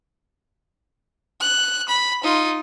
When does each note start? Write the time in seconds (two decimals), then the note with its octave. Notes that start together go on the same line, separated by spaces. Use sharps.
1.41 F#6
1.89 B5
2.24 D#4 F4